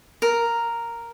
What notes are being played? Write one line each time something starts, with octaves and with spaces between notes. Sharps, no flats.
A#4